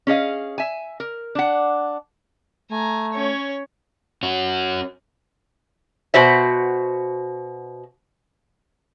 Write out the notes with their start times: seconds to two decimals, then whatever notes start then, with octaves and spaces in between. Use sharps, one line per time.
0.07 C#4 G#4 D#5 F5
0.58 E5 G#5
1.00 A#4
1.35 D4 F#5
2.71 A3 G#5 A#5
3.12 C#4 C#5
4.23 C#4 F#4
6.14 B2 F#4 C5 E5